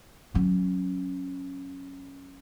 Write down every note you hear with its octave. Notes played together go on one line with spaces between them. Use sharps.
F#3 C#4